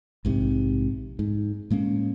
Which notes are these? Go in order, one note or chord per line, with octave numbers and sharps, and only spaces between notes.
A#1 G#2 C3
G#2
A2 G#3 A#3 C#4